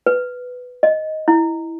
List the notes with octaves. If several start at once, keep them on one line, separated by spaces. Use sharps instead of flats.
B4
D#5
E4